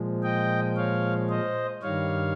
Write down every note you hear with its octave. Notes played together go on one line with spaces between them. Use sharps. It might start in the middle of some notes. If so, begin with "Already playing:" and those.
Already playing: A#2 F3 G#3
D#5 G5
C#5 F5
C5 D#5
G2 D#3 G3 C#5 F5